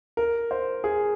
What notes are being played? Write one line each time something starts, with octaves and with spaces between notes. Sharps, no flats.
A#4
C5
G#4